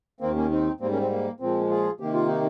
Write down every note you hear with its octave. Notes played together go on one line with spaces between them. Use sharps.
D#2 D#3 A#3 C4
A#3 C#4
C4 D#4
G#2 G3 A#3 C4
A#3 C#4
C4
A#3
A#2 F3 G#3 C4
F4 G#4
C3 D#3 A#3 G4
F4
D#4